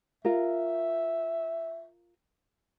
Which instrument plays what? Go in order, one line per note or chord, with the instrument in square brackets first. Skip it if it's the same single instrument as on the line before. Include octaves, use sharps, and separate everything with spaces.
[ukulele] F4 A#4 [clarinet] E5